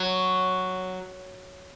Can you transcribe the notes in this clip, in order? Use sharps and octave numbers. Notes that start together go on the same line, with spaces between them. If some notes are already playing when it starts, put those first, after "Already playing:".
Already playing: F#3